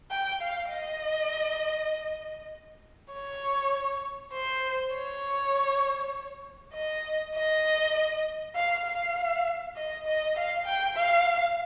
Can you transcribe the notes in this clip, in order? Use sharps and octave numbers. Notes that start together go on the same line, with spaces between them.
G5
F5
D#5
C#5
C5
C#5
D#5
D#5
F5
F5
D#5
D#5
F5
G5
F5